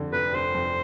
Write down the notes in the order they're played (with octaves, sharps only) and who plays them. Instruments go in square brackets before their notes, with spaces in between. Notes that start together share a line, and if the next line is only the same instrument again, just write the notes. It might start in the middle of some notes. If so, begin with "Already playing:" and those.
Already playing: [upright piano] F2 D3
[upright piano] F1 [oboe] B4
[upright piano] F1 [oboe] C5
[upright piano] F2